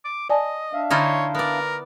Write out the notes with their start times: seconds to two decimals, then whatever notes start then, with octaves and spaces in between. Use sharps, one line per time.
0.05 D6
0.30 D5 D#5 G#5 A5
0.73 D4 E5 F5
0.91 D3 D#4 E4 C5 C#5 F6 A6
1.35 B3 A#4 D5